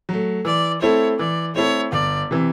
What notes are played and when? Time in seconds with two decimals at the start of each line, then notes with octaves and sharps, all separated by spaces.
0.09 F#3 A3
0.45 E3 D5
0.82 A3 C4 E4 A4 C#5
1.19 E3 D5
1.55 A3 C4 E4 A4 C#5
1.92 G1 D5
2.31 C3 E3